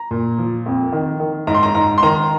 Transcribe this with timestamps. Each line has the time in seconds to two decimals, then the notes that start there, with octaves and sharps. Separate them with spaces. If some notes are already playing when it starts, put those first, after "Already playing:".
Already playing: A#5
0.11 A#2
0.39 F3
0.66 F2
0.92 D#3
1.20 D#3
1.47 G#2 A#5
1.54 C6
1.63 A#5
1.75 G#2 A#5
1.98 C6
2.03 D#3 A#5